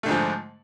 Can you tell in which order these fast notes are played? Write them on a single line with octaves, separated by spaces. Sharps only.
A3 D3 G#2 F3